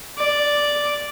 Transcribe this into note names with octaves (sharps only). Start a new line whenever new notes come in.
D5